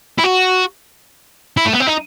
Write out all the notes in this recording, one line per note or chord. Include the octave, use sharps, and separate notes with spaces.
E4
F#4
E4
A3
B3
C4
D#4